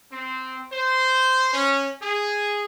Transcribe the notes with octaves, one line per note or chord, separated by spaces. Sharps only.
C4
C5
C#4
G#4